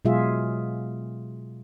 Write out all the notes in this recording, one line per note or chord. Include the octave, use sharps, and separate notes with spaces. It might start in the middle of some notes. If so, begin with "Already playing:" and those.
B2 F#3 G#3 F4 G#4 E5